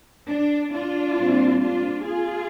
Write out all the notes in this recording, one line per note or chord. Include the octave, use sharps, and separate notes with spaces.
D4
D4 F4
A#2 G3 C4
D4 F4
F4 G#4